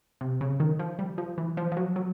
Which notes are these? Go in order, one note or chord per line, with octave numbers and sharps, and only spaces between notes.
C3
C#3
D#3
F3
G3
F3
E3
F3
F3
F#3
F#3